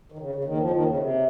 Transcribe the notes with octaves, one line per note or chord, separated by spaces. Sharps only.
D#3
C#3
C#3
D#2 D#3
F2 F3
D#2 D#3
C#3
C3